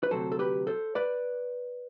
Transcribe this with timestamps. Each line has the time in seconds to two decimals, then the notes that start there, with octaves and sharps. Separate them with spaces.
0.03 B4
0.11 D2 C3 F#3 A4 C5
0.32 A4
0.39 G4 B4
0.67 A4 C5
0.95 B4 D5